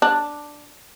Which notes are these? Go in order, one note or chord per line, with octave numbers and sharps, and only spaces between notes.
D4